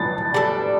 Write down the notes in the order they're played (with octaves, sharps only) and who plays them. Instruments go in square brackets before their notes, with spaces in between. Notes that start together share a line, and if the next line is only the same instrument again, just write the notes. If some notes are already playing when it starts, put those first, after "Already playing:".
Already playing: [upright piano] A6
[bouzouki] G3 D4 A4